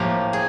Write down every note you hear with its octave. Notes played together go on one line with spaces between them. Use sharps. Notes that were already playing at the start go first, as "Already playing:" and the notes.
Already playing: A2 F3 A#3 G4
G#4